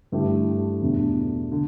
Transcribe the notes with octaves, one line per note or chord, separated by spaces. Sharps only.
G2 D3 A3 E4 G4
E2 B2 A3 D4
D3